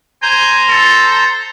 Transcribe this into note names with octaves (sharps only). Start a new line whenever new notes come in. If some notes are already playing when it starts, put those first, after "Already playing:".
C5 G#5 A#5 G6
A4